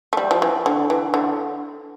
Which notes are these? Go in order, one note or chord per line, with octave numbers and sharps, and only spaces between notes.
A3
G3
F3
E3
D3
E3
D3